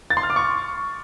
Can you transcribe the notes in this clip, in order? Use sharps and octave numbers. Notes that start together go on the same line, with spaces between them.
A6
C6
F6
D6
C#6